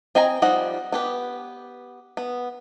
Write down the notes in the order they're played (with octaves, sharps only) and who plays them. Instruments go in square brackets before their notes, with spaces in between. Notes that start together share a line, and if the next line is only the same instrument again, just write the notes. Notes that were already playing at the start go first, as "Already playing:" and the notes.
[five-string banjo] C4 D#5 G5 G#5 A#5
F3 G3 D#4 D#5 F#5
B3 G4 B4
B3